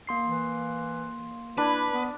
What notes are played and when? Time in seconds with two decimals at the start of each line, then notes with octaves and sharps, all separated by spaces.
0.07 A#3 C6 C7
0.23 E3
1.58 D4 E4 B4
1.91 B3